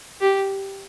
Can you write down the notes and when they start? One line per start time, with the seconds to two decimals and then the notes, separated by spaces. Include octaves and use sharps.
0.21 G4